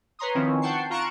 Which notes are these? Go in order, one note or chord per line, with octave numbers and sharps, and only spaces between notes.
B4 C#5 A#5 C6 D#6
D#3 F3 C4 C#4 E4
F#5 G5 A5 C#6 C7
F4 A#5 C#6 F#6 D7 E7